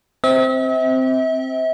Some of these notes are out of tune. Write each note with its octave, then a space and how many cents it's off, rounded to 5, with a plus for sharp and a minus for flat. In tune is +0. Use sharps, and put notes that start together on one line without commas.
C4 +0 E5 -40